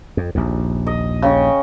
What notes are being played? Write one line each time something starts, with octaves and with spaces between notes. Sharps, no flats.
F2
A#1 D#2
D#5
C#3 G5 C#6